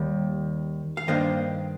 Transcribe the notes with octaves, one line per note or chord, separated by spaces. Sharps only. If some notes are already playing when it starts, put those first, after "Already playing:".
Already playing: D#2 D#3 G3
F5
G2 D#3 A#3 D4 C5 D#5